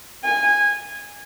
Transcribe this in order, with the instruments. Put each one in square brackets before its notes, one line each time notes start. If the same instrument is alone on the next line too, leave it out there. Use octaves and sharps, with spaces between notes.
[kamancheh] G#5